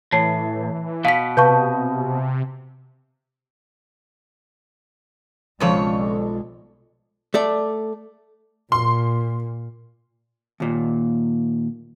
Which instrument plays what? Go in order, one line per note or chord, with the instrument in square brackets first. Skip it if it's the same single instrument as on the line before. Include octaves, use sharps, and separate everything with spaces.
[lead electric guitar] A2 [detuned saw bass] E3 [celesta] C#5 A5 C7
[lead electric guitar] B2 [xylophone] F5 B6
[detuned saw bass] C3 [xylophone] B4 A5 C#6 [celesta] F5 G6
[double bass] B1 G#3 [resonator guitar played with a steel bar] F2 C#3 C#5 [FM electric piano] F3 A4 D5
[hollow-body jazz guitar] A3 A4 D5
[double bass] A#2 [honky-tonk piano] C6
[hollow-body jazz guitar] D#2 A#2